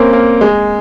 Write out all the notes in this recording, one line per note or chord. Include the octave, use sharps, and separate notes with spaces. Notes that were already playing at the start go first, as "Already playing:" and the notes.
Already playing: A#3 C4 C#4
A#3
G#3